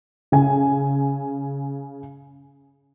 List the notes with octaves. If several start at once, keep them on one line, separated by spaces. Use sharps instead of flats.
C#3 G#5